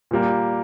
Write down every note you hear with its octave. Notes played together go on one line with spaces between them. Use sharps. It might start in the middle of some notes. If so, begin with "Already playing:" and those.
A#2 G3 A#3